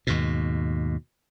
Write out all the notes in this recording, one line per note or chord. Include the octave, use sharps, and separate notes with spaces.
D#2 G#2 B2